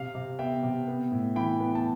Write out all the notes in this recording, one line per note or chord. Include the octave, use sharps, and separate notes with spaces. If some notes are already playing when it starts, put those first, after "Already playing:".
Already playing: C3 F5
C3
B3 E5 G5
C3
B3
A2
E3 G5 B5
B3
A5